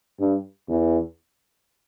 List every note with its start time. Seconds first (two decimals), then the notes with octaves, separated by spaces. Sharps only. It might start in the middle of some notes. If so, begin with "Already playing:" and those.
0.20 G2
0.68 E2